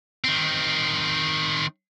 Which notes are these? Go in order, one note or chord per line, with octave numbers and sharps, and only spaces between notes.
D#3 C4